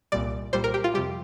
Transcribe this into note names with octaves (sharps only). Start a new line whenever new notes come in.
C2 A#2 G3 D5
C2 A#2 G3 C5
A#4
G4
F4
F2 C3 G3 G4